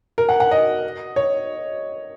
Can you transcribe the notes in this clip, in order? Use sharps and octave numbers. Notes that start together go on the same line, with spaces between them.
A#4
F#5
F#5
D#5
C#5